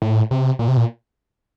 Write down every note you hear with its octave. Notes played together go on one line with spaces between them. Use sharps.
A2
C3
A#2
C3
A#2